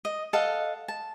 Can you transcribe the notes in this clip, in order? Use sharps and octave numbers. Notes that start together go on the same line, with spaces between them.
D#5
A4 D#5 F5 F#5
A5